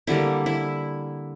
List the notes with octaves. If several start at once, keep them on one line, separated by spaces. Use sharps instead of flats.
D3 G3 A#3 E4
E4